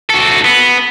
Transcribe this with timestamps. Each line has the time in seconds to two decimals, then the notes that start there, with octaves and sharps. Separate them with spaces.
0.10 F#4 A4
0.45 B3